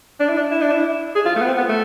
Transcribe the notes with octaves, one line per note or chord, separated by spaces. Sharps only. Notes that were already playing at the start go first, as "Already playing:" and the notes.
D4
E4
D4
E4
D4
E4
G#4
F4
A3
B3
C4
B3
A3